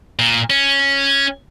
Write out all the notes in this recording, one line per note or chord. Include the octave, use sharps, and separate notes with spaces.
A#2
C#4